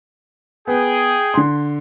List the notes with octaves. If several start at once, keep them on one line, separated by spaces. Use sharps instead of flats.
B3 G#4 G5
D3 C6